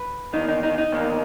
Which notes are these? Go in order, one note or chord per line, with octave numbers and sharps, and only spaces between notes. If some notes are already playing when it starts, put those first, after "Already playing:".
Already playing: B4
E2 D#3 A#3 D#4
D#4
D#4
D#4
E2 D#3 A#3